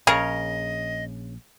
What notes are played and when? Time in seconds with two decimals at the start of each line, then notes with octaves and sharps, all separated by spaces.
0.07 A#1 C#3 G#4 A#4 C#5 D#5